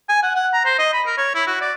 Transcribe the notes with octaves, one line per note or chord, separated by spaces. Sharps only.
G#5
F#5
F#5
A#5
C5
D#5
B5
A#4
C#5
E4
F#4
D5